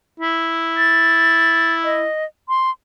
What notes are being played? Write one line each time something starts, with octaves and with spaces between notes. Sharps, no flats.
E4
A6
D#5
C6